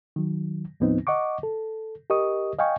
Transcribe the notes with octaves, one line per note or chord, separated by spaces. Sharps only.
D#3 F#3
D#2 A2 F3 B3 C4 D#4
D#5 F#5 C#6 D6
A4
G4 A#4 D#5 C#6 D#6
D#5 F5 G5 G#5 C#6